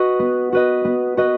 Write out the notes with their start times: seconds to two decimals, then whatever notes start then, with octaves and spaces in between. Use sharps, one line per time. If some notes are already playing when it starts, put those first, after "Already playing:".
Already playing: F#4 B4 D#5
0.19 B3
0.52 F#4 B4 D#5
0.85 B3
1.17 F#4 B4 D#5